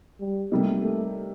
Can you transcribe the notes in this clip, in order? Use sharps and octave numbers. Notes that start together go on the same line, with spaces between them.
G3
C3 G3 A3 A#3 D#4
A3